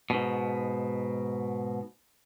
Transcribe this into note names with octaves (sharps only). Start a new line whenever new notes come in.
G#2 B2